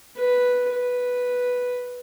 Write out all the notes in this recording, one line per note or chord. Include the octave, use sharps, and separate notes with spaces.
B4
B4